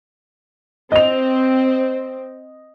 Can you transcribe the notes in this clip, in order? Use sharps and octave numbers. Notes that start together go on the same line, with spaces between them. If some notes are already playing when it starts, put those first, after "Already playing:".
C4 D#5 F7